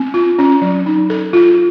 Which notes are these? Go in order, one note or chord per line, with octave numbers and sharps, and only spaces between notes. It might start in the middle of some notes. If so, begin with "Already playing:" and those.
Already playing: C4
F4
C#4
F#3
D#4
A4
F4